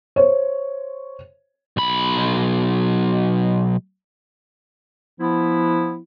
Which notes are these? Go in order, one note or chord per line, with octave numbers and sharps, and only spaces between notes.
C5 C#5
B1 B5
F3 B3 E4